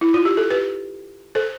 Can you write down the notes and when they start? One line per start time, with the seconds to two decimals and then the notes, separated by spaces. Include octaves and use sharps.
0.01 E4
0.14 F4
0.25 G4
0.37 A4
0.51 G4 B4
1.35 A4 C5